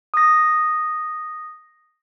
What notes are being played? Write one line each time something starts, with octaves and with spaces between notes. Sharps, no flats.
D#6 A#6